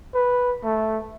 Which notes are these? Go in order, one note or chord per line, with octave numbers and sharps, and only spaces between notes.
B4
A3